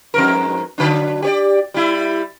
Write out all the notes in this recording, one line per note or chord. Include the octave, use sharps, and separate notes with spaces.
F2 G#2 A#4
D3 F#3 D4
G4 C#5 D5
G3 E4